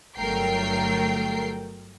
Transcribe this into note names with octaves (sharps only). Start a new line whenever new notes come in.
G1 F#3 A3 A#4 G5 C7